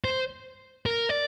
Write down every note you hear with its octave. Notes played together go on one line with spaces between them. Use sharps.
C5
A#4
D5